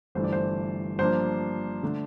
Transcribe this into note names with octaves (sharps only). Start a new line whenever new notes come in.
G1 G2 E3 A3 D4 C5
D5
C5
G2 F3 A#3 D4 C5
D3 A3 D4